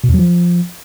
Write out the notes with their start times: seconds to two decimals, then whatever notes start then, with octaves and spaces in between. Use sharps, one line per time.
0.04 B2
0.09 E2
0.14 F#3
0.19 F3